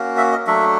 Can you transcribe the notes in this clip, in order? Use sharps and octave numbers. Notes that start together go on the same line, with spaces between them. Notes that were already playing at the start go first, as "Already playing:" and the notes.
Already playing: A#3 C#4 F#4
E5
D#5
F#3 A3 D4 E5